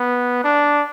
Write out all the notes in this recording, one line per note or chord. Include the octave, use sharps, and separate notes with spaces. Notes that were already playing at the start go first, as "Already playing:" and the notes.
Already playing: B3
D4